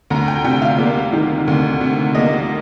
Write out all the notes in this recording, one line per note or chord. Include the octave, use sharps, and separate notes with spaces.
D2 A#5
G5
C3 G5
F5
A#3
D#3
D2
C3
A#3 D#5